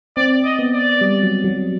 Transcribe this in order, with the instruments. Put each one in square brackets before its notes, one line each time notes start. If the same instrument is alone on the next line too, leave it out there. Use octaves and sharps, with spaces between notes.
[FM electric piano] C4 [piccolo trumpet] D5
[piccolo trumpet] D#5
[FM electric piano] B3
[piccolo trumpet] D5
[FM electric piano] G3
F#3
F#3